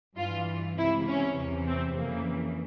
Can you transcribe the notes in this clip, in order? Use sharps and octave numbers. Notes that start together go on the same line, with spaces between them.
G2 E3 F4
C#2 C3 E3 E4
C#4
E2 C3 E3
C4
F2 C#3 E3 A#3